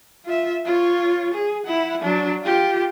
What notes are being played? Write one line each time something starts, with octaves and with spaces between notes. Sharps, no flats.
F4 E5
F4 C#5
G#4
E4 F#5
F#3 D4
F4 G4